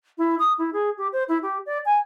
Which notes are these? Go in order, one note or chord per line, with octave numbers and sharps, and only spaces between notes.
E4
D#6
E4
G#4
G4
C5
E4
G4
D5
G#5